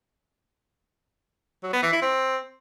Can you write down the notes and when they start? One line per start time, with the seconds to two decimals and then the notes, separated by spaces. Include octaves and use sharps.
1.63 F#3
1.73 B3
1.83 E3
1.92 E4
2.02 C4